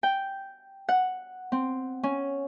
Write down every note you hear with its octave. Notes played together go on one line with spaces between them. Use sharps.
G5
F#5
C4
C#4